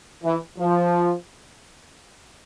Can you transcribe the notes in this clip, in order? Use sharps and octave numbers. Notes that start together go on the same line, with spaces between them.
E3
F3